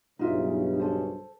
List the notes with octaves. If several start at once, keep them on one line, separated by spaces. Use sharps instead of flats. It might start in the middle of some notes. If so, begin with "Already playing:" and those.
B1 G2 C#3 D#4 F4 E5
A4 C5